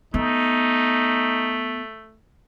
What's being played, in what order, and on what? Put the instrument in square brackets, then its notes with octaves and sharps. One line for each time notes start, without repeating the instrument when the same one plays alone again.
[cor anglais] A3 [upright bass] B3 [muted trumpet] D#4